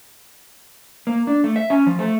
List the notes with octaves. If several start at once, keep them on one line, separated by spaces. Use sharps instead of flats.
A#3
D4
A3
E5
C#4
F3
A3